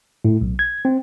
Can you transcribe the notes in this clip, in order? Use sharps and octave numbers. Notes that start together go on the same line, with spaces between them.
A2
B1
G#6
C4